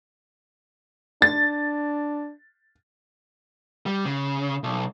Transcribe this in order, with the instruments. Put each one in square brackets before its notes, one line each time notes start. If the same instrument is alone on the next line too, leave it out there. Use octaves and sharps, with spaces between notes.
[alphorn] D4 [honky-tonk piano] A6
[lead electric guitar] G3
C#3
B1